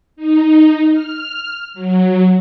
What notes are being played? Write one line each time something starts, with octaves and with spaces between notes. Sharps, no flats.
D#4
F6
F#3